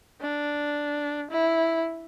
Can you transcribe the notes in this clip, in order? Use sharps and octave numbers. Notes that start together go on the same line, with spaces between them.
D4
E4